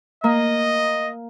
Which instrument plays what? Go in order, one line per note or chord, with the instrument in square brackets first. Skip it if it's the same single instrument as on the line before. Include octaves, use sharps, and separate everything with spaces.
[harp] A#3 [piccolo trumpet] D#5